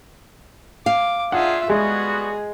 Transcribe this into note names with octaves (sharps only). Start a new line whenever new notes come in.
F5 D6
D4 D#4 F4 G#4 E5 F#5
G3 G#3 B3 F#4 G#4